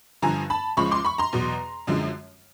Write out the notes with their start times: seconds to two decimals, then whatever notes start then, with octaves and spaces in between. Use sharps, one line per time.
0.22 G2 D3 F3 G#5 A#5
0.50 A5 B5
0.77 C#2 C#3 F3 G#3 B5 C#6
0.91 C6 D6
1.05 B5 C#6
1.18 A#5 C6
1.33 E2 B2 F#3
1.87 F#2 D3 F3 G#3